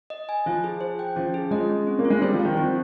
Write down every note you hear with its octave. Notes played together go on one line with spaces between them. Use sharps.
D#5
G#5
F3 F4
G#4
C5
G5
F3 C#4
G#4
G#3 D#5
C#4
C4
A#3
F4
G#3
G3 C5
F3
F5
D#3
F3 C4